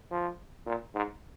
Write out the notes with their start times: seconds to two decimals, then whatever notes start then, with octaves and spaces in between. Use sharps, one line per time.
0.11 F3
0.66 A#2
0.94 G#2